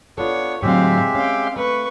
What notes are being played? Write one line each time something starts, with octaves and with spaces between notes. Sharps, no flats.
B3 D4 F4 A4 C#5
A2 D3 F#3 G#3 C4 G4 E5 F5
C#4 F5 G5
A3 B4 C#6